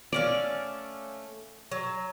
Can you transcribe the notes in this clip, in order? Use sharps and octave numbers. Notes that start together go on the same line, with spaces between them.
A3 C#4 D5 F5
F#3